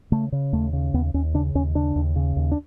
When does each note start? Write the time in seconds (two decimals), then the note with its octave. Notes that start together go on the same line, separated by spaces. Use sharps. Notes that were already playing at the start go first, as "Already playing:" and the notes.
0.12 C#3 A3
0.32 C#3
0.53 D#2 A3
0.73 C#3
0.94 D#2 B3
1.14 D#2 C#4
1.34 C#3 D4
1.55 D#2 C#4
1.75 C#3 D4
1.96 D#2
2.16 C#3
2.36 D#2
2.52 D4